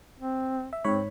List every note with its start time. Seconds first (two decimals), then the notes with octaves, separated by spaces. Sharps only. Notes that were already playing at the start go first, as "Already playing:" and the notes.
0.19 C4
0.73 E5
0.84 G#2 C4 C#5 B5